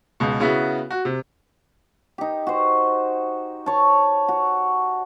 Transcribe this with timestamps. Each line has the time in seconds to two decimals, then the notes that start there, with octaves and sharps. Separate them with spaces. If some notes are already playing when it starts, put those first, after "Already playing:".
0.20 C#2 B2
0.40 C#3 B3 E4 F#4
0.91 F#4
1.05 C3
2.18 D#4 G4
2.47 F#4 C5
3.66 C#5 A5
4.28 F#4